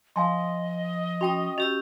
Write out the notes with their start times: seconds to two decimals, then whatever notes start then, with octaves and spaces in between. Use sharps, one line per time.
0.16 F3 D#5 F5 G#5 C6
1.21 C#4 F#4 G5 D#6
1.58 C#4 F#4 G4 D#5 E6